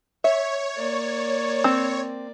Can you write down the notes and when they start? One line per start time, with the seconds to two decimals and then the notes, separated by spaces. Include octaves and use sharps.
0.24 C#5 E5
0.76 A#3 D5
1.64 C4